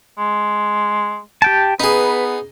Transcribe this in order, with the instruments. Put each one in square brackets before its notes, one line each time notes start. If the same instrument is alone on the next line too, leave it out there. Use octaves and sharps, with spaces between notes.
[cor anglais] G#3
[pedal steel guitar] G4 G5 A5
[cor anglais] B3 [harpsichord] D#4 G#4 [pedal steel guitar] B4